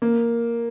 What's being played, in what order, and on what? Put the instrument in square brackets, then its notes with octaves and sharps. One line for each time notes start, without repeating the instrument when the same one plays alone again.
[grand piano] A#3